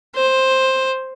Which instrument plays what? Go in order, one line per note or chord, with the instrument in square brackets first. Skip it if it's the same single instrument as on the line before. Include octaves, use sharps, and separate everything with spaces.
[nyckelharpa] C5